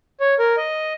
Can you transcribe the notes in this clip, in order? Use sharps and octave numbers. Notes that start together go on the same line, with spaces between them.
C#5
A#4
D#5